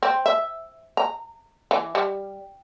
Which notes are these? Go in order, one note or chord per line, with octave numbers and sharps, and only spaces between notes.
C4
E5
A#5
E3
G3